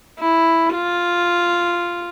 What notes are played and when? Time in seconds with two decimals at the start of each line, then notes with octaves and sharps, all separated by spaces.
0.20 E4
0.74 F4